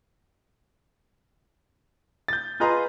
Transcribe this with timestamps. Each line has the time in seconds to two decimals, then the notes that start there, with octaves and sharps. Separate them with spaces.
2.28 G6 A6
2.60 F4 G#4 B4 D#5 A#5 C6